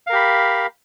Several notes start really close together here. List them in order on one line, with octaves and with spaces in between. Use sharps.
F5 A#4 G4 B5